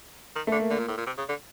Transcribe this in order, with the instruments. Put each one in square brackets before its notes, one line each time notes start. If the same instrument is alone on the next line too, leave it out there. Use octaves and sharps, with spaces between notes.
[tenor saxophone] D#3
[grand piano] A3
[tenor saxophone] D3
[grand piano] A#3
[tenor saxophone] D3
A#2
A2
A#2
C3
C#3
D3